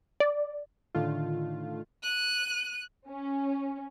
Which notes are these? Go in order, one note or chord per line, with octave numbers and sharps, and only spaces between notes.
D5
A2 D3 D#3 A3 F4
F#6 D#7
C#4